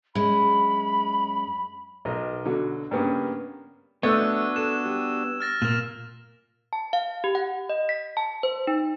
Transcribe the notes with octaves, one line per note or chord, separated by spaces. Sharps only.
F#2 G#3 B5
B1 A#4 D#5
B2 D3 F#3
G2 C#3 A#3 B3 C#4
A3 B3 D4 F#4 E6 G#6
A4 E7
G3
F6 A6 A#6
A#2 A#3 F6 E7
A5
F5
G4
F#5
D#5
B6
A5
C5
D#4